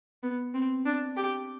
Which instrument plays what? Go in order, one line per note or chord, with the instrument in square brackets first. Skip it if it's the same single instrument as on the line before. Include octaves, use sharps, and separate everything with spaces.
[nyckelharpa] B3
C4
D4
G4